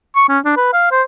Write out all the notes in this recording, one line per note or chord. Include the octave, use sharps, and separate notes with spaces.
C#6
C#4
D4
B4
F5
C5